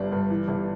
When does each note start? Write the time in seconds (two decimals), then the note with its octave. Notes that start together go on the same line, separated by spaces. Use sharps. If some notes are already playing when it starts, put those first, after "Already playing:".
Already playing: G1 G2 D4
0.12 G2
0.30 E3
0.48 G1